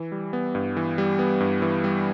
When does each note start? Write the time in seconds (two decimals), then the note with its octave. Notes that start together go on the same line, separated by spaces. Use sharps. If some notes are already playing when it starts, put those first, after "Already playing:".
Already playing: E3
0.12 G3
0.33 B3
0.55 G2
0.77 E3
0.98 G3
1.19 B3
1.40 G2
1.62 E3
1.84 G3